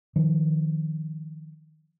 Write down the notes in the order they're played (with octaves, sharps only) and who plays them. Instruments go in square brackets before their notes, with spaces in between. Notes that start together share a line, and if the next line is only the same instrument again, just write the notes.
[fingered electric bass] D#3 F3